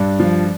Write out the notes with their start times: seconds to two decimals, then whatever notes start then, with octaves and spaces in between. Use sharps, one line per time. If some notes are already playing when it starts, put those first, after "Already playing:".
Already playing: G2 D4
0.19 F3